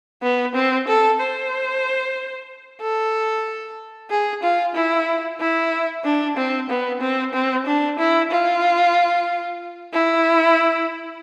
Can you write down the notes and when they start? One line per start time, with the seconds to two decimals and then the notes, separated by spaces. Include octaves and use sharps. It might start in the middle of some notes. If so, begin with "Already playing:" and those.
0.23 B3
0.55 C4
0.88 A4
1.20 C5
2.82 A4
4.11 G#4
4.43 F4
4.75 E4
5.40 E4
6.05 D4
6.37 C4
6.70 B3
7.01 C4
7.34 C4
7.66 D4
7.99 E4
8.31 F4
9.94 E4